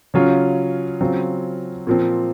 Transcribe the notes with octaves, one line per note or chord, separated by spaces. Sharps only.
C#3 F#3 C#4 F4
C#3 F#3 C4 F4
A#2 F3 C4